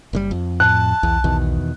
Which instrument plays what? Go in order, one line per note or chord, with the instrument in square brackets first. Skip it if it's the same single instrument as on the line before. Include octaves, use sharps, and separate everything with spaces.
[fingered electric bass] F#1 C3 G3
F2
[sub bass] A2 [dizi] A5 [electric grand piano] F#6
[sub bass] B1 [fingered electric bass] E2
[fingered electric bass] E2 B2 D#3